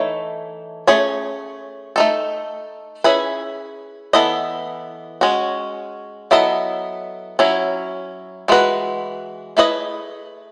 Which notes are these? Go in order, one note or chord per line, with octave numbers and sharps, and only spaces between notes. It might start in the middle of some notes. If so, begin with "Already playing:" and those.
Already playing: E3 A3 D#4 A4 C#5
A3 C#4 G#4 C#5
A3 D#4 A4
C#4 E4 G#4 B4
E3 B3 E4 A4 D#5
G#3 C#4 F#4
F#3 B3 E4 A4 D#5
F#3 C#4 E4
E3 G#3 C#4 F#4 B4
A3 E4 G#4 B4 D#5